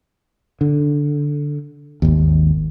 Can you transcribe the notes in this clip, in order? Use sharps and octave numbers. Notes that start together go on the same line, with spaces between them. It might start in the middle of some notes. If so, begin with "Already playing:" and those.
D3
G#1 D#2